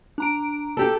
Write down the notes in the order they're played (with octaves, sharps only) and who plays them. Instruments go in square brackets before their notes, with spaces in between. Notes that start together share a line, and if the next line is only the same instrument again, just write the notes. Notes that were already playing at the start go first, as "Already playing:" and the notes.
[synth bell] D4 A#5 D7
[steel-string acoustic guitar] G4 A4